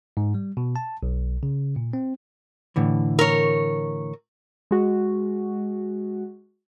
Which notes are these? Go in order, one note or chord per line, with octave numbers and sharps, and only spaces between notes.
G#2
G3
B2
A5
B1
C#3
A#2
C4
A2 D3 E3
A#4 C#5
G#3 F#4